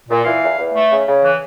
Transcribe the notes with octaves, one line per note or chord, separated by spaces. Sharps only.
A#2
E3 F5
E2
E2
A3
C#3
C#3
E3